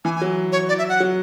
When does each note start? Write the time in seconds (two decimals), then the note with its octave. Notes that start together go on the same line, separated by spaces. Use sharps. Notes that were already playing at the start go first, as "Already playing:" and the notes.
0.05 E3 G#5
0.16 G#5
0.21 F#3
0.52 C#5
0.69 D5
0.78 E5
0.89 F#5
1.00 F#3